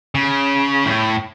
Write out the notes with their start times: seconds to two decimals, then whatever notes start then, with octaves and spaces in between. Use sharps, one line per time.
0.15 C#3
0.85 A2